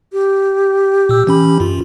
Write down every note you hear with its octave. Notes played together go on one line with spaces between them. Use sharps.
G4
A#2 E6
E3 C#4 B5
F#2 F4